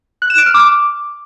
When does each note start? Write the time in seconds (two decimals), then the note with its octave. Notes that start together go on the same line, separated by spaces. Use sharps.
0.22 F#6
0.30 E7
0.38 D7
0.46 F6
0.54 D6